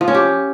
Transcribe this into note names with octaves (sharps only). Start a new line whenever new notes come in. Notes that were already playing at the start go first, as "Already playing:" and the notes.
F3
C#4
G4